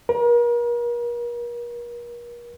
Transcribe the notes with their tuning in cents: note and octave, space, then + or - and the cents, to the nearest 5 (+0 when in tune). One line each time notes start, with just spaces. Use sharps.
A#4 +40